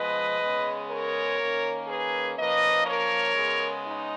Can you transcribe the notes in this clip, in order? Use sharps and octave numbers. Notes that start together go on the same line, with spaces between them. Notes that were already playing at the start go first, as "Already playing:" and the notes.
Already playing: F3 G#3 B3 B4 D#5
C#3 G#3 B3
A#4 C#5
D#3 A#3 C#4
G#4 B4
F3 A#3 C#4 B4 D#5
A#4 C#5
C#3 G#3 B3
D#4